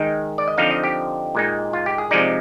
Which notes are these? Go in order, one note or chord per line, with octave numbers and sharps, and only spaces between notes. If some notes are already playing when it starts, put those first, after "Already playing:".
Already playing: D#3 G#3 D#4 G5
D5
D#5
D3 F3 C4 D#4 F5
D#5
G4
A#2 G#3 D#4
F4
G4
G#4
C3 F3 G#3 D#4 D5